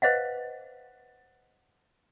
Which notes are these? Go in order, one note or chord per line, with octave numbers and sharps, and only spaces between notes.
B4 C5 D#5 F5 F#5